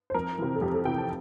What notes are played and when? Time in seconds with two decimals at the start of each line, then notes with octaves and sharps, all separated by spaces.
0.10 C5
0.14 F2 A#4
0.38 C3 E3
0.55 A4
0.61 F2 G4
0.74 A4
0.85 C3 E3 G5
0.98 A5